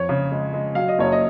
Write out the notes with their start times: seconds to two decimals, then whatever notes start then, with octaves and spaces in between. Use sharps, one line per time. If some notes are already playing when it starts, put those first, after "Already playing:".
Already playing: F2 C#5
0.09 C#3
0.32 G#3
0.53 G#3
0.75 F#3 F5
0.88 D#5
0.99 F#1 C#5
1.12 D#5